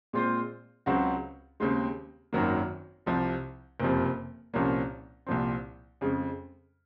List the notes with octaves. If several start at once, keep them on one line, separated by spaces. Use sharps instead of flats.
A#2 G#3 C4 F4 C5
C#2 C#3 F#3 C4 F#4
D#2 C#3 G#3 C4
G#1 F#2 D#3 F#3 A#3
C2 C3 F3
F#1 F2 C3 F3
C2 A#2 F3 A#3 C#4
C2 A#2 F3 C4
F2 C#3 G#3